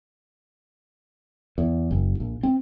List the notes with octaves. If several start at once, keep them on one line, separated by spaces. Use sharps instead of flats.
E2
F#1
A#1
C4